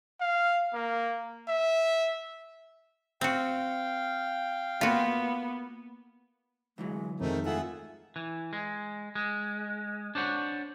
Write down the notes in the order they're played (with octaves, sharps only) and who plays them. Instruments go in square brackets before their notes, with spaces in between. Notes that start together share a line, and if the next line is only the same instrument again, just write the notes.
[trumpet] F5
A#3
E5
[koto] C4 F#4 [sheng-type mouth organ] F5 G5
[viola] A#3 B3 [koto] F4 F#4
[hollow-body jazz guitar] D2 E3 F#3 [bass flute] G#3
[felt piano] F2 D#3 G#3 [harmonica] A3 C4 D#4 [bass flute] A#4
[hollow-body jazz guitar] A2 F4 [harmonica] G#4 E5 F#5 [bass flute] A4
[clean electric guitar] E3
G#3
G#3
D4 C5 C#5 F#5